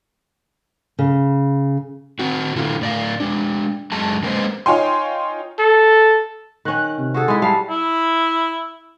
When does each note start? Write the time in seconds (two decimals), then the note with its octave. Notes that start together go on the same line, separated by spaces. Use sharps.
0.99 C#3
2.19 C4 F#4
2.56 D3 E4 F4
2.81 A2 D5 F5
3.20 G#3 D4
3.92 F#2 G#3 A5
4.23 G#3 A#3 C#4 B4 C5 D#5
4.66 D#4 F4 C#5 G5 G#5 C6
5.59 A4
6.65 D#3 C#4 F#6
6.98 C3
7.14 F#4 G#4 A4
7.28 G#3 E4 G#4
7.42 G3 F5 A5
7.70 E4